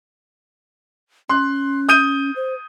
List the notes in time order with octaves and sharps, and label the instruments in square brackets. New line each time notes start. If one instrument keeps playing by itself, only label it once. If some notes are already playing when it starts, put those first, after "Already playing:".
[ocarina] C#4 [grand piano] C6 F#6
[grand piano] D#6 G6 D#7
[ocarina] C5